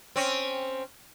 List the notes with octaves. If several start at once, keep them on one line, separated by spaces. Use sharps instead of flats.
C4 C#4